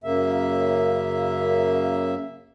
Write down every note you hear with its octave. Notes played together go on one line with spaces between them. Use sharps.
F#2 C#3 A#3 E5